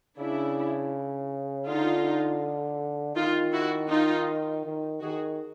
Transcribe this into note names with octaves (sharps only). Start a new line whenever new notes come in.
C#3 D4 E4
D3 D#4 F4
D#3 D#4 F4
E4 F#4
D#4 F4
D#3
D#3 F#4 G#4